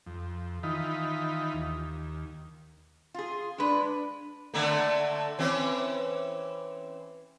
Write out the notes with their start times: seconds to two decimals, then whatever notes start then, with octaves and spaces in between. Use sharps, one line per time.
0.06 F2
0.63 D#3 E3 D#4 F4 B5
1.54 D#2
3.14 F4 G#4
3.58 G#3 D4 B4
4.54 D3 A3 A#3
5.39 E3 C4 C#4